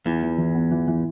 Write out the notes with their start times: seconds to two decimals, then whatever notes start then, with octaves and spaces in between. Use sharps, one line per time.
0.05 E2 E3
0.23 E3
0.38 E3
0.55 B3
0.71 E3
0.87 E3